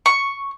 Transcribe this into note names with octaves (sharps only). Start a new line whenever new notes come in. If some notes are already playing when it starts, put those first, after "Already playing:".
C#6